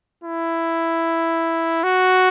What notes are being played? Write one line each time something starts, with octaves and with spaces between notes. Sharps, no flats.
E4
F#4